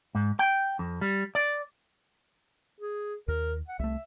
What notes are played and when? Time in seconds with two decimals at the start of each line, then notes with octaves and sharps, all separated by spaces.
0.15 G#2
0.39 G5
0.79 F2
1.01 G3
1.35 D5
2.79 G#4
3.28 D#2 A#4
3.68 F#5
3.79 C2 A3 E5